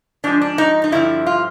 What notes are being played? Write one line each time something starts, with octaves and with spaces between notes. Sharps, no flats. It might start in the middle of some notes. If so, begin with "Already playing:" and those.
G#2 F3 D4
D4
D#4
D#4
G2 D3 F3 E4
F4